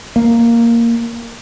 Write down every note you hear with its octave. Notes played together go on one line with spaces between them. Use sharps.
A#3